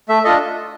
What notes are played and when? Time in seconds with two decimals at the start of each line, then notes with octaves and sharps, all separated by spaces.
0.09 A3 E5
0.24 D4 F4 A4 D#5